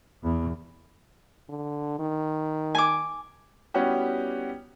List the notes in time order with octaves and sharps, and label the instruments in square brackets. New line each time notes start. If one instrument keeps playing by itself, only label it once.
[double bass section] E2
[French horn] D3
D#3
[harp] G#5 D6
[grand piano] G3 B3 C#4 E4 F#4 G4